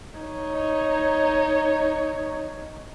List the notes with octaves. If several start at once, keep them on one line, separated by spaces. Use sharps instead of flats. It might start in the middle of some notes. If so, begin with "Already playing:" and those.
D#4 C#5